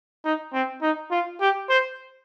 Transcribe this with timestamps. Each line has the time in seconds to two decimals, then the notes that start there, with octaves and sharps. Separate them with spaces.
0.25 D#4
0.53 C4
0.82 D#4
1.11 F4
1.41 G4
1.69 C5